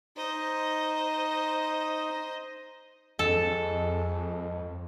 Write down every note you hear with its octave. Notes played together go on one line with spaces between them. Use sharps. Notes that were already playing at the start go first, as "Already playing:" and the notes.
D#4 C5 D#5
F2 G#3 A4